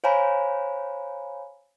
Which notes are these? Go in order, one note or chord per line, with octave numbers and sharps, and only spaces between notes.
C5 C#5 F5 G#5 A#5 B5